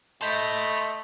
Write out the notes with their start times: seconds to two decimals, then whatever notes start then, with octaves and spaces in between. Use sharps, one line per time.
0.21 A3 D#5 A5 B5 C6 G6 B6